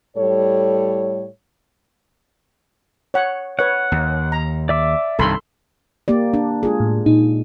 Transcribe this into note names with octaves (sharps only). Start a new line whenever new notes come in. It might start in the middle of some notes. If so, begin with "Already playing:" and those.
A2 G3 A4 C#5
C#5 F#5
B4 C#5 F#5
D#2
A#5
D5 E5 D6
C2 G2 D#3 A4 B5 C6
A#3 G4 D5
D4
G#3 F4 G#4
A2
A#2 D#4